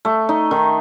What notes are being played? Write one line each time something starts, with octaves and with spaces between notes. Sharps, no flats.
A3
D#4
D#3